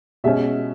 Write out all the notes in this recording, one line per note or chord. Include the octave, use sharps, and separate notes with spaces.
B2 G#3 C#4 E5